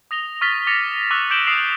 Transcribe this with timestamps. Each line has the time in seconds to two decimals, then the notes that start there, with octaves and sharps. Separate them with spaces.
0.11 D#6 A#6 F7 G7
0.41 C#6 F6 A6 B6 G7
0.67 D6 A6 A#6 C#7 F7
1.11 C#6 D6 E6 F#6 F7
1.30 D6 G6 D7 E7 F#7 G7
1.46 D#6 E6 C7 D7 E7 F7